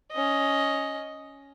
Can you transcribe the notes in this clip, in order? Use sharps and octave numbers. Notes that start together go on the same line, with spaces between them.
C#4 D#5